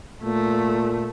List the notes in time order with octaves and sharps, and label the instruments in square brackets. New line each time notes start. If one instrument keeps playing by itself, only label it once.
[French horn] A#2 [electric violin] A3